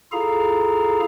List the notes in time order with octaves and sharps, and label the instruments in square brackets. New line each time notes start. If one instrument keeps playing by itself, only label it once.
[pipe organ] E4 F4 G#4 A4 F5 A#5